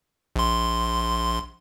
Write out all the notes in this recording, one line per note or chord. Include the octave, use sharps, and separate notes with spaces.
A#1 C6